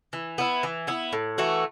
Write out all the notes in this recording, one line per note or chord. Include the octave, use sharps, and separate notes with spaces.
E3
B3 E4
E3
B3 E4
A2
E3 A3 F#4